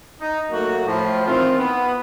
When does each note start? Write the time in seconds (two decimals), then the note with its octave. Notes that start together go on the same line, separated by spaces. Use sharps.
0.20 D#4
0.51 F#3 A3 A#3 F#4
0.86 A2 F3
1.26 D#3 E3 C4 F4
1.58 B3